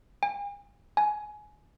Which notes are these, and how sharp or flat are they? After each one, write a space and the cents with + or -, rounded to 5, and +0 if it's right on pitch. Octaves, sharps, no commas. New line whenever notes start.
G#5 -40
G#5 +20